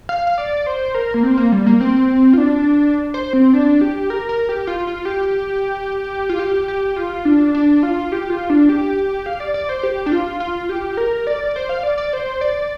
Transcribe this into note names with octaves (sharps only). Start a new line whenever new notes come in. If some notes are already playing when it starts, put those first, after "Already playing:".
F5
F5
D5
C5
A#4
A#3
C4
A#3
G3
A#3
C4
F4
D4
C5
C4
D4
G4
A#4
A#4
G4
F4
F4
G4
F4
G4
G4
F4
D4
D4
F4
G4
F4
D4
G4
F5
D5
D5
C5
G4
D4
F4
F4
G4
A#4
D5
C5
F5
D5
D5
C5
D5